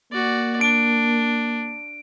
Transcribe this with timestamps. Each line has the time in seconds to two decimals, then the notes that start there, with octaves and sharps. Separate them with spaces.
0.12 A#3 F#4 D5
0.61 D4 D7